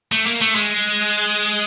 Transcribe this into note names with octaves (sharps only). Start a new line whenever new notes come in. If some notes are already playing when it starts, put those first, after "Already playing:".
A3
A#3
A3
G#3